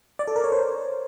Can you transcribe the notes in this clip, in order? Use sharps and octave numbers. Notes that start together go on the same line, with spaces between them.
D5
A4
A#4
C#5
C5